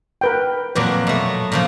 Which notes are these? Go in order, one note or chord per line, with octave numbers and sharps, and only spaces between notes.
A#4 B4 G5
F2 A#2 F#3 B4 D6
B2 A3
A#2 C#3 F3